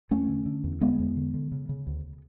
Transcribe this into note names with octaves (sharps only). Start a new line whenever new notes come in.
E2 A3 C#4
D3
D3
E2
D3 G#3 B3
E2
D3
D3
C#3
C#3
D2